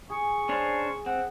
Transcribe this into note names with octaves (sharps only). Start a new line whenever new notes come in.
G#4 C#6
C#4 D4 C5
C4 F#5